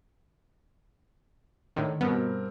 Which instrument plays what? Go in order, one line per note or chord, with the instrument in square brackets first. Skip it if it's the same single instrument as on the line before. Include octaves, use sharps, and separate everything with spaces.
[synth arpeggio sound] A2 D3 D#3
[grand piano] G2 C4 A#4 [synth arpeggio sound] B2 B3